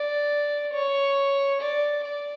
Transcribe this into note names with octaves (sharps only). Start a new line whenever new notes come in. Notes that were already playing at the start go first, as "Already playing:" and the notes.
Already playing: D5
C#5
D5
D5